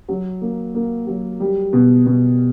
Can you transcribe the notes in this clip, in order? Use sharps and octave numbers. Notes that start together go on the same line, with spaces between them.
F#3
A#3
A#3
F#3
G3
B2
B2